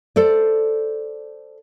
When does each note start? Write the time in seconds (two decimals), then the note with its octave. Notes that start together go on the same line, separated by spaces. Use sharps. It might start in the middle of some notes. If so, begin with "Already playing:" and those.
0.16 A4 C5 D5